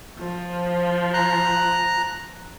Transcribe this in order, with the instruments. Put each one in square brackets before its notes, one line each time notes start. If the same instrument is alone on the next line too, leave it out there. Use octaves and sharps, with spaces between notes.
[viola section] F3
[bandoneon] A#5 F#6